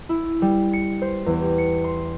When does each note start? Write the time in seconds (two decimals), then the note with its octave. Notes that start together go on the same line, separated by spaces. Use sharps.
0.09 E4
0.42 G3
0.73 C#7
1.02 C5
1.26 E2
1.41 G4
1.58 C#7
1.84 C6